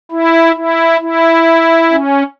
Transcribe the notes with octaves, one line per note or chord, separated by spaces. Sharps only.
E4
E4
E4
C#4